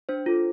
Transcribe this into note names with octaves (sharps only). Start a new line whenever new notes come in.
D4 C5
F4 A4